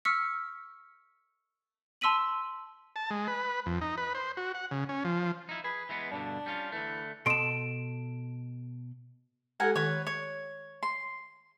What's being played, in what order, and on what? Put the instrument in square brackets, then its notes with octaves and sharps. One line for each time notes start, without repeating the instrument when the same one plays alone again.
[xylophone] C#6 E6 F6 B6 C#7
A5 C6 E6 B6 D#7 F#7
[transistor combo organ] A5
G#3
B4
F2
D#4
B4
C5
F#4
F#5
C#3
C#4
F3
[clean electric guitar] D#4 E4
[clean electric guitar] G#4 [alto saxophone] B4
[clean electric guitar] E3 G#3 B3
[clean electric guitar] G2 B2 D3 [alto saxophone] D4
[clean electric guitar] G3 C#4 F4
[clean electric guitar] D3 A3 [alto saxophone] E3
[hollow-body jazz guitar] B2 A4 C6 [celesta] D7 E7
[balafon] G#3 G4 A4 [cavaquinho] A#4 F#5 G#5
[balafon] D#3 [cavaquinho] B4 C#5
[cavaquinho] C#5
C6